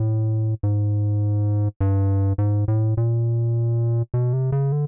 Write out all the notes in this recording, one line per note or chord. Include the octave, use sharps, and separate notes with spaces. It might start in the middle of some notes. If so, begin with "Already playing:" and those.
Already playing: A2
G#2
G2
G#2
A2
A#2
B2
C3
C#3
D3